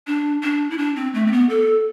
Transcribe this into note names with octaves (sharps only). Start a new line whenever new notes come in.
D4
D4
E4
D4
C4
A3
C4
B3
A4